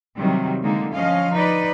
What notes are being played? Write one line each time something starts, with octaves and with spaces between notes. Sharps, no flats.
C3 D#3 F#3 G3
D3 G#3 A#3 D#4
F3 C#4 D#5 F5
D#4 B4 D5